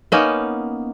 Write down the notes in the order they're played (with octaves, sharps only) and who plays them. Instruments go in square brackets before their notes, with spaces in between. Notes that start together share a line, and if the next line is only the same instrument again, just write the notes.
[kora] A#3 B3 C#4 D#4